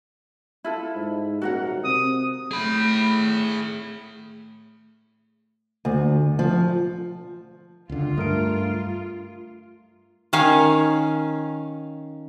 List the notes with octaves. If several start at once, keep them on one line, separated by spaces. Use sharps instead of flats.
E4 F4 A4
G#2
D#1 F#4 A#4 F#5
C3 D#6
A2 G#4 B5
D2
F3
C#2 D3 F4
G2 A3 A#4 D7
D#3 C#4 F5 G#5